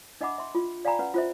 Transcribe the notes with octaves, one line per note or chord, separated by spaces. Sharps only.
D4 D#5 E5 F#5 B5 D6
E5 C6
F4
D5 F5 G5 G#5 A#5 B5
C#4 B4 F#5
F4 C5 E5